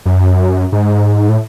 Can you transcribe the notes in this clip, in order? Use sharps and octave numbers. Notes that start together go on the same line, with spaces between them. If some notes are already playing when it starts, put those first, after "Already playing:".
F#2
G#2
A2